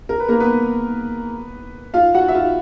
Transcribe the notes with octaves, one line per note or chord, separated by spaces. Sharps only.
A#4
B4
A#3 A#4
B3 B4
F4 F5
F#4 F#5
E5
F4 F5